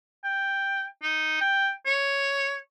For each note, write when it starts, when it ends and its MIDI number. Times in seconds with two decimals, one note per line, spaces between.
0.24 0.85 79
1.03 1.39 63
1.41 1.71 79
1.86 2.57 73